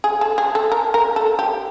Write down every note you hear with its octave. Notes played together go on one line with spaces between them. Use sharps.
G#4
A4
G#4
A4
A#4
A#4
A4
G4